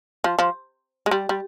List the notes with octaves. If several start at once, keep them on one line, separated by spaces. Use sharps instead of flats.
F3
F3
G#3
G3
G3